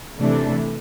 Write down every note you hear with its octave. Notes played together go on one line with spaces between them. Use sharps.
C3 E3 A3 D4